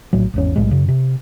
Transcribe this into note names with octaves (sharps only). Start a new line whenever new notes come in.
A#1 A2 F#3
G#1 E2 C#4
B1 A2 G3 G#3
F#2 C#3
C3